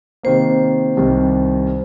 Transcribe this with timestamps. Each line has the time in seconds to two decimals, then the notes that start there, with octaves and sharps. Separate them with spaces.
0.23 C3 D#3 A#3 C5
0.97 C2 C3 D#3 G3